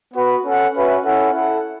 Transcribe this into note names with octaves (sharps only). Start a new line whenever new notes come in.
B3 F#4 B4 F#5
C#4 A4 F#5
C#4 F#4 B4 E5
C#4 E4 A4 F#5
E4 A4 F#5